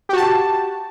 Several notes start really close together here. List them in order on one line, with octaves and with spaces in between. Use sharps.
G4 F#4 A5